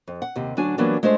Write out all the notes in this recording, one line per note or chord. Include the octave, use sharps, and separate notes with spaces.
F2
F#5
D#2 C3
D2 F#3 D4 G#5
E3 F#3 G3 A#3 B3 D4
G#3 A3 D4 F4 C5